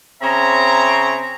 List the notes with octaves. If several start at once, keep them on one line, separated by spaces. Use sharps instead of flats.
C#3 C4 C#5 E5 A#5